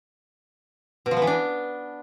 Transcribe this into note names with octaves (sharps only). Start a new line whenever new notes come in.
B2
F3
B3
E3
D4